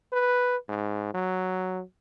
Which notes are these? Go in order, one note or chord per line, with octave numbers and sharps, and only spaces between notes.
B4
G#2
F#3